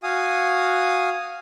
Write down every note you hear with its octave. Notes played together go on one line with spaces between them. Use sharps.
F#4 F5 G#5 D#6